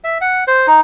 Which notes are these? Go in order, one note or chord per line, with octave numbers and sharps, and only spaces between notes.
E5
F#5
C5
D#4